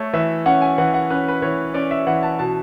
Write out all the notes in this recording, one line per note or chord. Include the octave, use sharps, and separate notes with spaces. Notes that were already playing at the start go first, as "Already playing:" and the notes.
Already playing: A3 C#5
E3 E5
C#4 F#5
G#5
E3 F#5
F#5
C#4 B4
B4
E3 C#5
C#4 D5
E5
E3 F#5
A5
B2 A5